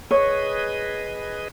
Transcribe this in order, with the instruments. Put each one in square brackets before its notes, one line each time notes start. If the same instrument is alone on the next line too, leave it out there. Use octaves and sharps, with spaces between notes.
[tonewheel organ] G#4 B4 D#5 [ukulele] C#5